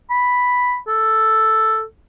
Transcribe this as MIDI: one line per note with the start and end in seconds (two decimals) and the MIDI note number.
0.10 0.77 83
0.88 1.82 69